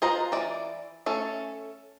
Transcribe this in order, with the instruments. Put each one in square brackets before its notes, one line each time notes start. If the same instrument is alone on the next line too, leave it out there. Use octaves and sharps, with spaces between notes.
[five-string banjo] F4 B4 C5 D#5 A#5
E3 D5
A3 C#4 A4